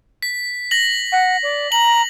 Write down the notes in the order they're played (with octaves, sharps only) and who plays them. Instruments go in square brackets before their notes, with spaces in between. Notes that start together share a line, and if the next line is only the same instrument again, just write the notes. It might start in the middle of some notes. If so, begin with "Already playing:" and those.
[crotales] B6
A#6 F#7
[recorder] F#5
D5
[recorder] A#5 [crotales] F#7